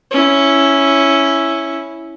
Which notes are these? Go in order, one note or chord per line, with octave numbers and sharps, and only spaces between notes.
C#4 E4